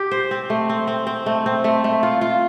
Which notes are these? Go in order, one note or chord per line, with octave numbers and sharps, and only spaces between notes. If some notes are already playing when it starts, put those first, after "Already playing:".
Already playing: G4
C5
C4
A3
C4
C4
C4
A3
C4
A3
A3
F4
F4